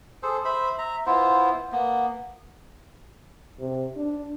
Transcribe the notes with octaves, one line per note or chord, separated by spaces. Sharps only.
G#4 A4 C5
C5 E5 B5
E5 A#5
B3 E4 F4 C5
A#3 B3
C3
D4